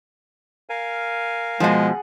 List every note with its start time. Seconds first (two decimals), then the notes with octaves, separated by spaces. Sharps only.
0.69 A#4 F5 G#5
1.60 B2 F3 G#3 G#4 F#5 A5